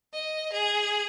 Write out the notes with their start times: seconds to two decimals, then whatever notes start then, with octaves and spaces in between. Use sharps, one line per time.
0.13 D#5
0.52 G#4